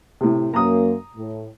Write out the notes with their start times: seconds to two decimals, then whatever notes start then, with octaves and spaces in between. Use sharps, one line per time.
0.21 A2 C3
0.54 F#2 A#3 A#5 D#6
1.16 A2